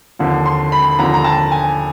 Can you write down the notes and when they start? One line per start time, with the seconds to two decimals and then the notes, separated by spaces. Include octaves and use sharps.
0.19 D#2 D3 F3
0.46 C6
0.72 B5
0.99 D#2 D3 F3 A#5
1.14 A#5
1.24 A5
1.52 G#5